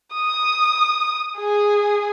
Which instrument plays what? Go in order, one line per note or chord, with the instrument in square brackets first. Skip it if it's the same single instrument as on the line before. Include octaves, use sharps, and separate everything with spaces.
[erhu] D#6
G#4